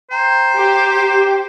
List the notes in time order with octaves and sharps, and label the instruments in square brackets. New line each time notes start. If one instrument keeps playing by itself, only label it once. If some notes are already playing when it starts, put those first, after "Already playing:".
[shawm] C5 [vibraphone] G5 A#5
[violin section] G4